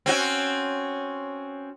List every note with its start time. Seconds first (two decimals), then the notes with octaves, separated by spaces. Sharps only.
0.06 C4 C#4 F#4